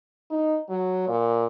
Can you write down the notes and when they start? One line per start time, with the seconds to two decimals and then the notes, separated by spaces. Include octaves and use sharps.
0.31 D#4
0.69 F#3
1.08 A#2